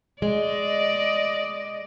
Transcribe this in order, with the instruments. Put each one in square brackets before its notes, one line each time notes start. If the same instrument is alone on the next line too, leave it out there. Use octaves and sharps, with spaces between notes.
[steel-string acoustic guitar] G#3 [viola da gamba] D5 D#5